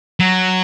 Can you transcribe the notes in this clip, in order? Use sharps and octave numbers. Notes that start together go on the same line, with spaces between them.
F#3